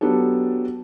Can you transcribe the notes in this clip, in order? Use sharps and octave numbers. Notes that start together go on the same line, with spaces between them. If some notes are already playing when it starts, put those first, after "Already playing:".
F#3 B3 D4 G4 A4